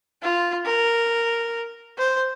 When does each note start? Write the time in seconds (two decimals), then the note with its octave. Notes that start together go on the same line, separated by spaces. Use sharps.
0.23 F4
0.66 A#4
1.98 C5